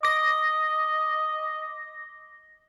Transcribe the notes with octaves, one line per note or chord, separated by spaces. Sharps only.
D#5 D6 A#6